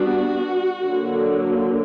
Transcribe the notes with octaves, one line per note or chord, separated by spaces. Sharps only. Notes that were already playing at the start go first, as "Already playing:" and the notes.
Already playing: G3 B3 D4 F#4
D3 F#3 A#3